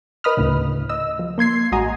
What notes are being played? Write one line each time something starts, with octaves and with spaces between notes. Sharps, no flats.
A#4 B4 D#5 B5 D#6 F6
D2 A2 C#3
D#5 E6
F3
A#3 C6 G#6 C7
A1 G#3 F#4 D#5 G#5 A#5